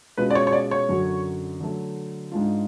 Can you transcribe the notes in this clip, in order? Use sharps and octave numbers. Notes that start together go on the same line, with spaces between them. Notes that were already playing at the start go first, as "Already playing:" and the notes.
B2 G#3 C#4 F4 G#4 B4
D5
C#5
C#5
D5
C#5
F#2 D3 F#3 C#4 F#4
D3 F#3 A3
G#2 G#3 D4 F4